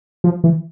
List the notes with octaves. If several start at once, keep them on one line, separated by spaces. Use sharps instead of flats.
F3
E3